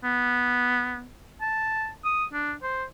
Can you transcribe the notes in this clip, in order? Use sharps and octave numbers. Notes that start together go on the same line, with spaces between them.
B3
A5
D#6
D4
C5